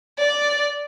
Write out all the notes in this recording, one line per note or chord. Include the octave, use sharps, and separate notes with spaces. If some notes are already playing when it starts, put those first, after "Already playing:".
D5